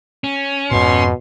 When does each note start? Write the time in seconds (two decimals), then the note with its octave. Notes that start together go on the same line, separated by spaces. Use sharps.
0.24 C#4
0.71 F2 G#2 B2 C6